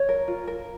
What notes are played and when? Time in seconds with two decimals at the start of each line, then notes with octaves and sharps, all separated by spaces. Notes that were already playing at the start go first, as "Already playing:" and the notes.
Already playing: C#5
0.09 A#4
0.28 F4
0.47 A#4